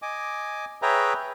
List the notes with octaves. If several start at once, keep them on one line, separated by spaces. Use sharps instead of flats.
D#5 G#5 D6
G#4 B4 C#5 E5 G5 A#5